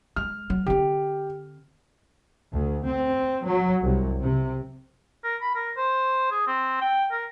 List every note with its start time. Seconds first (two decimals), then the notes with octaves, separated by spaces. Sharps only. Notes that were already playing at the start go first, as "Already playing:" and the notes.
0.16 G#3 F6
0.50 F#3
0.66 D3 C4 G4
2.52 D2
2.86 C4
3.44 F#3
3.82 C2
4.20 C3
5.24 A#4
5.41 B5
5.55 A#4
5.77 C5
6.31 G#4
6.47 C4
6.81 G5
7.11 A#4